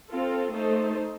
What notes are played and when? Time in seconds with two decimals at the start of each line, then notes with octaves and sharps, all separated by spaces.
0.10 C4 F4 A4
0.53 A3 D#4 A4 C5